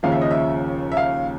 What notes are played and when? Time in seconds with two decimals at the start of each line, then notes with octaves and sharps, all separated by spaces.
0.03 D#2 C#3 F3 F5
0.12 E5
0.21 D#5
0.31 E5
0.92 E5
0.97 F5